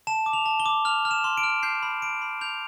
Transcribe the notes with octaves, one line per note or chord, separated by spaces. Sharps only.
A5 E7
D6
F7
A5
G7
D6
F6 F7
F6
E7
C6
D7
F6
G6 C7
B5
B5 D7
B5
G6 F7